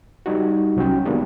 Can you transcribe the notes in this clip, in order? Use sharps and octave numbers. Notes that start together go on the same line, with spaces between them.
G3 D#4 F#4
C2 F#3 C#4 G5
D#3 G3 G#3 A#3 B3 D4